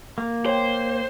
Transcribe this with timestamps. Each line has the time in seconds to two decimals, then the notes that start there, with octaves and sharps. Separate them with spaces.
0.18 A#3
0.46 C5 C#5 G5